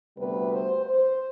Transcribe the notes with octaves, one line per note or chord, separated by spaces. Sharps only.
D2 C3 G3 B3 B4
C5
C5